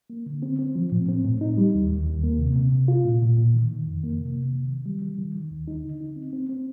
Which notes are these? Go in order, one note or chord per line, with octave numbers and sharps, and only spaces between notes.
A#3
D3
C4
C4
F3
A2
C4
A2
D#4
G3
D#2
D#2
D#2
A#3
C3
C3
C3
F4
A#2
A#2
A#2
D#3
D#3
F2
A#3
C3
C3
D#3
D#3
G3
G3
D#3
D#3
D#2
D#4
D3
D#4
C4
C4
C4